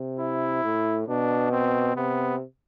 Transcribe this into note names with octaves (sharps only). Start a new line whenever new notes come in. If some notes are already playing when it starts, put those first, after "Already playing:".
Already playing: C3
E4
A2
B2 D4
C4
C3 B3